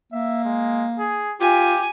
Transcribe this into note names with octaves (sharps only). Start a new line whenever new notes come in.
A#3 E5
G#3
G#4
F4 G4 G#5